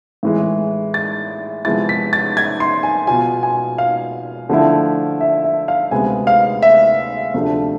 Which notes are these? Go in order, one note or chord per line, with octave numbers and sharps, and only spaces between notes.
A2 E3 G#3
A6
C3 F3 G#3 B3 E4 A6
B6
A6
G#6
C6
G#5
B2 B3 F4 G#5
G#5
F5
D3 F3 A3 E4
E5
E5
F5
D2 C3 G#3 B3 G#5
F5
E5
D2 C3 F3 A3 D4